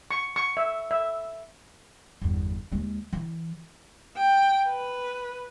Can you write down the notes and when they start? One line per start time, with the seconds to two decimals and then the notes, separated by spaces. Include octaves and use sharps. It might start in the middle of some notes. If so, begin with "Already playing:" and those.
0.11 C#6
0.36 C#6
0.57 E5
0.91 E5
2.22 G1 E2
2.72 D#2 G#3
3.13 E3
4.17 G5
4.69 B4